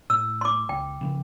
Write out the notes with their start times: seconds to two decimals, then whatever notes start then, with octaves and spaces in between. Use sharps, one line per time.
0.10 A2 E6
0.41 C6 D6
0.69 C#2 G5
1.01 C#3 E3 F3